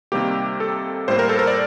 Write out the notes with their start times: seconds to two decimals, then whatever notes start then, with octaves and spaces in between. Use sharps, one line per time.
0.12 C3 D#3 G3 A#3 G4
0.60 A4
1.08 A2 G3 A#3 C5
1.19 A#4
1.29 A4
1.39 A#4
1.47 D5